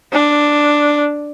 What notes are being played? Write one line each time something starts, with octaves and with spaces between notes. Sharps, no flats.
D4